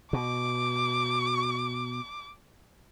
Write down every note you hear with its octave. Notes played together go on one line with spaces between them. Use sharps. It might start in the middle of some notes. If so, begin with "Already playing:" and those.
B2 D6